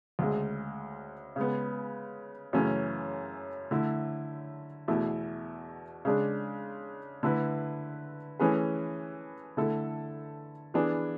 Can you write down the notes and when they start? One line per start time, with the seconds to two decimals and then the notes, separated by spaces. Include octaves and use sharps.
0.19 D2 C#3 G#3
1.36 C#3 G#3 B3
2.53 F#2 C#3 E3 A3 C#4
3.71 D3 A3 E4
4.88 E2 B2 A3 E4
6.05 C#3 G#3 D4
7.23 D3 A3 E4 B4
8.39 E3 A3 C#4 G#4 B4
9.57 D3 A3 E4 A4
10.74 E3 B3 D4 G#4